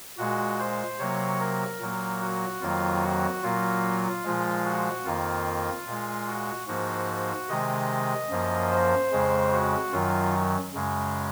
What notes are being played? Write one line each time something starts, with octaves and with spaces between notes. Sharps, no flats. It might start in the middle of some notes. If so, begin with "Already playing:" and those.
A#2 G#3 F#4
C5
C3 F#3 A#3 C#5
A#4
A#2 F#3 A#3
F#4
F2 D#3 F#3 A#3 F4
F#4
A#2 F#3 A#3 F4
A#2 F3 G#3
F#4
F2 D#3 A#3 F4
A#2 G#3
F#4
G#2 F3 A#3 F#4
C3 D#3 G#3 D#5
F#2 F3 A#3
C5
F2 C#3 G#3
F#4
F#2 D#3 F#3 F4
F#2 C#3 G#3